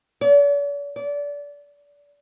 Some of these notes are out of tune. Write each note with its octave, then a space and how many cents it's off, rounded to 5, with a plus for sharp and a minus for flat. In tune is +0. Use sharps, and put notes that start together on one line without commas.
D5 -45
D5 -25